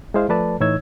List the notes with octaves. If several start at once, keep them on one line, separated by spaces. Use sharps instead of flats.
G#3 E4 G#4 C5 F5
F3 A3 A4 B4 D5 A5
A2 E3 D#4 C#5 E6 G#6